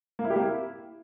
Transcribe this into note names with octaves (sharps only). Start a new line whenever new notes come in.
A#3
E4
G4
A#3
E4